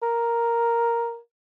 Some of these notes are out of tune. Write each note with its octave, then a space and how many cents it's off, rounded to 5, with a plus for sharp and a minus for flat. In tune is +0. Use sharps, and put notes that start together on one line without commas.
A#4 +0